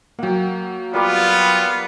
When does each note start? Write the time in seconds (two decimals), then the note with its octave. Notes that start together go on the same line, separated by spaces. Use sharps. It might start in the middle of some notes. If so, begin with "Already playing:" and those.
0.19 F#3 A#3 F#5 G5
0.93 G3 B3 F4 A#4 D6